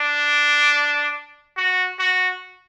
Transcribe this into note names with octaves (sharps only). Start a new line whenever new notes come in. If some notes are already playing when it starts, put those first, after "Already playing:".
Already playing: D4
F#4
F#4